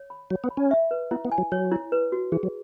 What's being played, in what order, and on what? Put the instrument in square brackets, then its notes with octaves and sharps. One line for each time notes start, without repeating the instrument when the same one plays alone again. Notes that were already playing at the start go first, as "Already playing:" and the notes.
Already playing: [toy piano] C#5
B5
[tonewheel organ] F#3 [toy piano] C#5
[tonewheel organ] B3
[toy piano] B5
[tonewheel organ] C#4
[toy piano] E5
B4
[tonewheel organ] B3 [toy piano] E4
[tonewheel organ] B3
[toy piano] G#5
[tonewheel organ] F#3
[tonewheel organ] F#3 [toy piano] C#5
[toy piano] E4
B4
F#4
[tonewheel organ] E3 [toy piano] G#4
[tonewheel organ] F#3